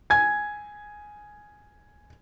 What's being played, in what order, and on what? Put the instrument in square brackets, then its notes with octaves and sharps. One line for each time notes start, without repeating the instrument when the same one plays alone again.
[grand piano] G#5 G#6